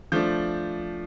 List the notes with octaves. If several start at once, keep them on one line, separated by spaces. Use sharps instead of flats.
F3 A3 D4 G6